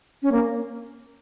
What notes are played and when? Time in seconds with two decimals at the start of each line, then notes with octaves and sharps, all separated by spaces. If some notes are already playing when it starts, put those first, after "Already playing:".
0.23 C#4
0.32 A#3